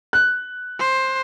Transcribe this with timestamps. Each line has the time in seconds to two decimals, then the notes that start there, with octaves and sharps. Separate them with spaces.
0.13 F#6
0.79 C5